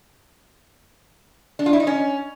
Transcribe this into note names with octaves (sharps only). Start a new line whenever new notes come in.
D4
F4
E4
D#4
C#4